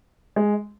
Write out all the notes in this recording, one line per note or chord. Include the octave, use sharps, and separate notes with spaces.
G#3